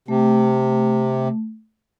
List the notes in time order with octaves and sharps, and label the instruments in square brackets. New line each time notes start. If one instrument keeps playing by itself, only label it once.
[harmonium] C3 [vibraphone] A3